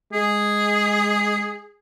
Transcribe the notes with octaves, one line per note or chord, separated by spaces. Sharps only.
G#3 G#4